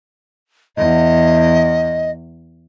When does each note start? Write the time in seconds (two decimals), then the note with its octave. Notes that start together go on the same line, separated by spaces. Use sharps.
0.77 E2 D#5